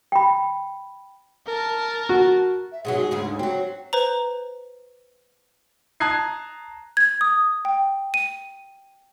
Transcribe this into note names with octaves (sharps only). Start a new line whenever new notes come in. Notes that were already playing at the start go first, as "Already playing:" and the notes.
G5 B5
A#4 A5
F#4
E5
G#2 B2 F#3 G#4
D2 G#2 C#3
F#3 C4 F#4
B4 C5 A#5
A5 A#5 D#6 F#6 G#6 C7
G#6
D#6
G5
D#7